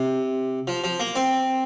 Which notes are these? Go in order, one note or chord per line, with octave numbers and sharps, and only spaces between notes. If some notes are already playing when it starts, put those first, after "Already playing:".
Already playing: C3
F3
F3
A#3
C4